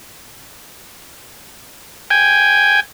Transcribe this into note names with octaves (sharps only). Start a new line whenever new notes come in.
G5 G#5